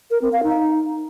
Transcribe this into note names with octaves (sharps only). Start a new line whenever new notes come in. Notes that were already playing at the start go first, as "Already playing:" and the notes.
A#4
C4
F5
D#4